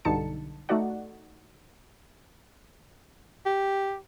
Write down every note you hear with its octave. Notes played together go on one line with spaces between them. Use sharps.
B1 G2 D3 D#4 A5 C#7
A3 D#4 F#4 D5 F#5
G4